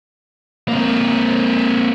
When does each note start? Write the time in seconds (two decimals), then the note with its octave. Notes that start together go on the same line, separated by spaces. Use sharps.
0.68 A#3 C4